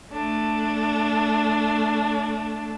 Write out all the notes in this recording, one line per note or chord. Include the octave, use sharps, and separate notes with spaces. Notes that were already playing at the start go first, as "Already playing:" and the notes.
A3 D4